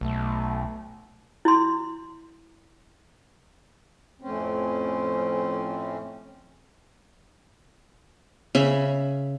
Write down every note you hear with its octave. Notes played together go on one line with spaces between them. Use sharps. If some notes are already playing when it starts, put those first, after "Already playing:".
B1 A3
E4 C6
F2 A2 C4 C#4
C#3 E5 B5